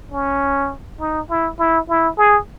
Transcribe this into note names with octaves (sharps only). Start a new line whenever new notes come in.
C#4
D#4
E4
E4
E4
G#4